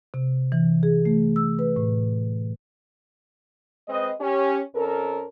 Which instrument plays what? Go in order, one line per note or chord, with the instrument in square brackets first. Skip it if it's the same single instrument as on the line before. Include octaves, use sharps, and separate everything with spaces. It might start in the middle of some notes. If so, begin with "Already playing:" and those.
[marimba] C3
E3
G#4
A3
E6
B4
A2
[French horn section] G#3 C4 B4 D#5
C#4 G4
F2 C#4 A4 A#4